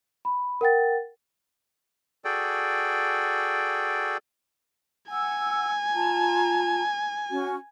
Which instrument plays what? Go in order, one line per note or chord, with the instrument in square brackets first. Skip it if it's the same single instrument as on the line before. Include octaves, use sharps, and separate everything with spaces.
[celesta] B5
A#4 F#5 G5 A6
[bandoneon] F#4 G#4 A4 D5 G5
[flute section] F#5 E6 [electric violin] G#5
[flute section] F4 A5 A#5
C#4 F#4